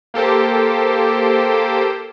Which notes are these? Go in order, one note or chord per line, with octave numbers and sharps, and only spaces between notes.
A#3 G4 A4 C5